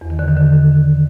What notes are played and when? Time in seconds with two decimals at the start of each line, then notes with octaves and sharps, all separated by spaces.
0.01 E2
0.10 D#3
0.19 D3
0.28 D#3
0.37 D3